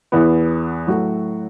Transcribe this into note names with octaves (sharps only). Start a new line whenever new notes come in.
E2 E3 B3
A2 F#3 A3 F#4